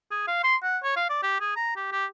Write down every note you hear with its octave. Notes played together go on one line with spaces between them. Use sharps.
G#4
F5
C6
F#5
C#5
F5
D5
G4
G#4
A#5
G4
G4